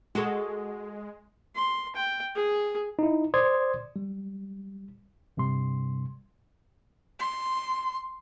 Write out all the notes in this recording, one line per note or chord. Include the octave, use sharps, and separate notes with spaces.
G#3 F#4 G#4 A4
C6
G5
G#4
D#4 E4
C5 D5 C6 D#6 G#6
G3
G2 C3 G3 C6
C6